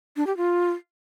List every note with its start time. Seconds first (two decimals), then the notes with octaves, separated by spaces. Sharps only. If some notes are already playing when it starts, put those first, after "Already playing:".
0.17 D4
0.27 G4
0.37 F4